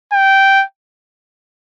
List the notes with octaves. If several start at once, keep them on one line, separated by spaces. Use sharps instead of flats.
G5